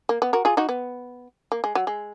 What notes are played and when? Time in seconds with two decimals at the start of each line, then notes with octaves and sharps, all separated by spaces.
0.09 A#3
0.22 B3
0.33 F#4 A#4
0.45 F4 G#4
0.57 D#4 F#4
0.69 B3
1.52 A#3
1.64 G#3
1.75 F#3
1.87 G#3